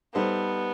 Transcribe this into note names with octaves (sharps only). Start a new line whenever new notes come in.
G3 B3 D#4 A4 C5